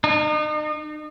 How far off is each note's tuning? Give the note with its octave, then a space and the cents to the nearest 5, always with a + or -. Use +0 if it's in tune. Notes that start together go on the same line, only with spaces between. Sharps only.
D#4 -40